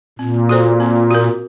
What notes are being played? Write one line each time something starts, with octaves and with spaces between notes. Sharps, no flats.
A#2 C4
F#4 A4 C5
C4
F#4 A#4